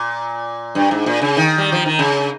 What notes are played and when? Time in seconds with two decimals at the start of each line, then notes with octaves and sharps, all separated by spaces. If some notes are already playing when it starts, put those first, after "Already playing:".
Already playing: A#2
0.75 G2
0.91 G#2
1.06 A#2
1.22 C#3
1.37 D#3
1.58 G3
1.72 F3
1.86 D#3
1.99 C#3